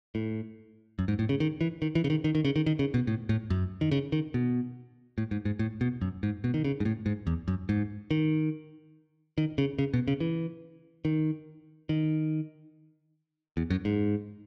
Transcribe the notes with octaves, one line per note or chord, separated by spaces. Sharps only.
A2
F#2
G#2
A2
C#3
D#3
E3
D#3
E3
C#3
D#3
D#3
D#3
C#3
D#3
D#3
C#3
B2
A2
A2
F#2
D#3
C#3
D#3
B2
A2
G#2
G#2
A2
B2
F#2
G#2
B2
D#3
C#3
G#2
A2
G#2
E2
F#2
G#2
D#3
D#3
C#3
C#3
B2
C#3
E3
D#3
D#3
E2
F#2
G#2